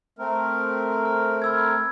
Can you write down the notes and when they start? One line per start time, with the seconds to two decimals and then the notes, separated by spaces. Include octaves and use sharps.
0.19 A3 C4 A#4
1.05 F6
1.42 B5 E6 G#6